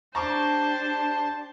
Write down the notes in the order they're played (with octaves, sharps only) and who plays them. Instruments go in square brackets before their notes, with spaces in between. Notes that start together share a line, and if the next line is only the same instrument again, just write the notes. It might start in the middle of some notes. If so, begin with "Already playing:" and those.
[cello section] D4 G4 [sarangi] C5 [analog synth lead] A5 [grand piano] A#5 C#6 D6